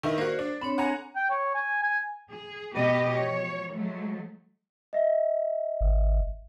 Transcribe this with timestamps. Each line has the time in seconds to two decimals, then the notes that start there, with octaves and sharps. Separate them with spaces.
0.03 D#3 D#4 E4 A#4 B4
0.18 A#3 F#4 C5 D5
0.39 D4
0.61 C4 D4 C#5 B5
0.78 F#5 G#5 A#5
1.16 G5
1.30 C#5
1.54 G#5
1.82 G#5
2.29 G#4
2.74 B2 B3 G4 B4 D#5
3.10 F3 C#5
3.73 F3 F#3 G#3 A3
4.93 D#5 E5
5.81 G#1